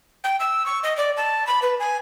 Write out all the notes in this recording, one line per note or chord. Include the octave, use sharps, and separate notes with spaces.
G5
E6
C#6
D#5
D5
A5
B5
B4
G#5